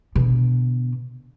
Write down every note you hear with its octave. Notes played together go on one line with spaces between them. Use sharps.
B2 D3